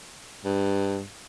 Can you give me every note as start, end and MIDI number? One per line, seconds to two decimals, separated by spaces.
0.45 1.03 43